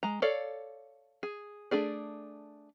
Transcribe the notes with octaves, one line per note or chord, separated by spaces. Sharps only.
G#3 A#5
A4 C#5 D5 F5
G#4
A3 D4 G#4 D5